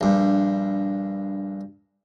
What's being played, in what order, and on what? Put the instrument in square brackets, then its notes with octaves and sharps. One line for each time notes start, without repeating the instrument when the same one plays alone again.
[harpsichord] A#1 G2